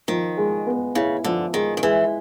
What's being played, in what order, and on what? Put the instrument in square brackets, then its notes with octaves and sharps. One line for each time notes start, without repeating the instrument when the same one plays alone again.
[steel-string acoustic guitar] D#3 [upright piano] F3
[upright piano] G#3
B3
[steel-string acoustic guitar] C#3 [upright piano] E4
[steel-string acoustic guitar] D3 [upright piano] F3
[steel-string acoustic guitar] D#3 [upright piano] G#3
[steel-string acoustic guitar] D#3
[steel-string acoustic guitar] E3 [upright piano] G#3